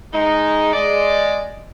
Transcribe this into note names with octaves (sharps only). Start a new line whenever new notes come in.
G#3 D#4
G#3 D5 D#5